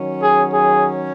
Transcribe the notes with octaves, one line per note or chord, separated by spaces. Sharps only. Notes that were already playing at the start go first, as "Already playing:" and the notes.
Already playing: D#3 F#3 C#4
G#4
G#4